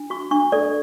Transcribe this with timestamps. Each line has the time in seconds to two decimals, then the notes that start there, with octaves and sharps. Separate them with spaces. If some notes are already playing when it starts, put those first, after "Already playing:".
Already playing: D4
0.10 F#4 C#6
0.31 D4 C#6
0.52 A4 D5